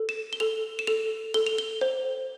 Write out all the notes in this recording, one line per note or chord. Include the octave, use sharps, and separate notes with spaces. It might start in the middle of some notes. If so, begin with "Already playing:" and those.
Already playing: A4
E7
G7
A4 F7
E7
A4 F7
A4 G7
F7
G7
C5